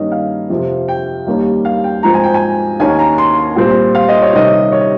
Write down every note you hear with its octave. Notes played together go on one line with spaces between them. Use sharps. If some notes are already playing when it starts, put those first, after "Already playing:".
Already playing: G2 D#3 A#3 C#4 D#5
F5
F2 C3 F3
G5
D#2 D#3 G3 A#3 C#4
F5
G5
G#2 F3 C4 A#5
G#5
G5
G#5
D#2 D#3 A#3 C#4 G#5
A#5
C6
A#2 G3 C4
F5
D#5
C#5
C3 D#3 G3 C#4 D#5
C#5